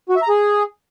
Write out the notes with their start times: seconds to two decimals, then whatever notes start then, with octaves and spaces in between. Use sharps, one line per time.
0.09 F#4
0.16 E5
0.22 A#5
0.29 G#4